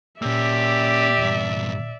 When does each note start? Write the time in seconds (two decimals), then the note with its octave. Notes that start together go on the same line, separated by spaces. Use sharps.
0.22 A#2 A#3 C#4 G4 D5 E5 E6
1.18 E2 G2